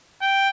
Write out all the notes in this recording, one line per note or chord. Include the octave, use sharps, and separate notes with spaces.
G5